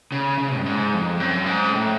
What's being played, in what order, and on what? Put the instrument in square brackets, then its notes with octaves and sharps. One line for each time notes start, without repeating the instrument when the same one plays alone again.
[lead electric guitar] C#3
C#3
G2
G#2
F2
F#2
G#2
A2